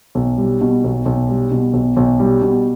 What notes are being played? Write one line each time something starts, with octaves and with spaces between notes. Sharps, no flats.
B1
G3
B2
B1
B1
G3
B2
B1
B1
G3
B2